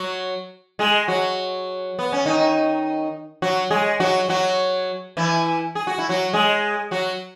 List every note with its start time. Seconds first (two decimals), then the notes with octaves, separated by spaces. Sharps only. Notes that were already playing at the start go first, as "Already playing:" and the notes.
Already playing: F#3 F#4
0.79 G#3 G#4
1.08 F#3 F#4
1.99 B3
2.13 C#4
2.26 D#3 D#4
3.42 F#3 F#4
3.70 G#3 G#4
4.00 F#3 F#4
4.29 F#3 F#4
5.17 E3 E4
5.75 G#4
5.87 F#4
5.98 E4
6.09 F#3 F#4
6.33 G#3 G#4
6.91 F#3 F#4